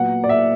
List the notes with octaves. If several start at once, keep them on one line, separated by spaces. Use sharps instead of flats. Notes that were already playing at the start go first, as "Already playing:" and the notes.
Already playing: A#2 F#3 B3 F#5
D5
E5